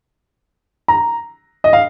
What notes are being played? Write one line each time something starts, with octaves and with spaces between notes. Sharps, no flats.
A#5
D#5
F5